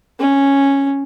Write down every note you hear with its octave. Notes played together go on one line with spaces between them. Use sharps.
C#4